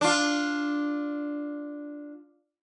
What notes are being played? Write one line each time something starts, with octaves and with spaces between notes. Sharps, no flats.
D4 F4